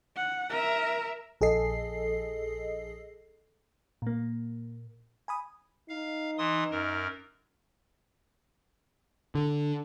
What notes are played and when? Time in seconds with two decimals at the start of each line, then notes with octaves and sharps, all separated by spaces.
0.16 F#5
0.50 A#4 E5
1.41 A#1 G#4 A4 D#5 C7
4.02 A#2 A#3
5.28 G#5 B5 D#6
5.89 D#4 F5
6.38 E3 C6 D#6
6.71 F#2 A#4
9.35 D3